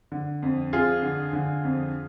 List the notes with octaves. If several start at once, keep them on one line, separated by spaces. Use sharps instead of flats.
D3
F2
F2 F4 G#4
D3
D3
F2